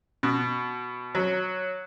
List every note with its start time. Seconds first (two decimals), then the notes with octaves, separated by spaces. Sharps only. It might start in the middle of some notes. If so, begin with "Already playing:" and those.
0.23 B2
1.15 F#3